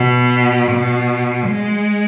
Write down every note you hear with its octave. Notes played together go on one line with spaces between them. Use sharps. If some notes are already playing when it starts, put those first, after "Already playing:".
Already playing: B2
B2
G#3